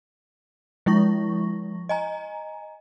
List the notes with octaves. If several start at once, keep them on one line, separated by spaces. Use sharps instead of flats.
F3 G#3 E4 C#6 A#6
D#5 G#5 A#5